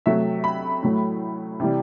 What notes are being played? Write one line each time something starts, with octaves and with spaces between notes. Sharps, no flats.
C3 F#3 A3 E5
B5
A2 F#3 A3
C3 E3 G3